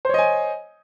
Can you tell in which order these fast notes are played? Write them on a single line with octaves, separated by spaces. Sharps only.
C5 C#5 D#5 G#5